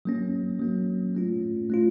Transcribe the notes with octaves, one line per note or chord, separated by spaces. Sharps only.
F#3 A#3 C#4
F#3 A#3 C#4
A3 C#4 F4
A3 C#4 F4